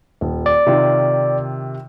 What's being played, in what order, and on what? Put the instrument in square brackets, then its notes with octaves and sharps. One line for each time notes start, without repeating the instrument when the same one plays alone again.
[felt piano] D#1
[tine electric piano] D5
[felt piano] C3 D#3 F4